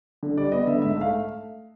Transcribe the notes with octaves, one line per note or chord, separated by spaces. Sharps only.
D3
G3 D5
B3 D#5
D3 E5
G#2 E5
A3
F5